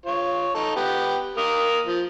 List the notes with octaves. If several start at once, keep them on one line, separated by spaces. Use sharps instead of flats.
F4 C#5
D#4 A4
B3 G4
A#3 A#4 D#6
F3